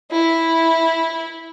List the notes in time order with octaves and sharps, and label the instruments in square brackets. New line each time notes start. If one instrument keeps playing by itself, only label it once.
[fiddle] E4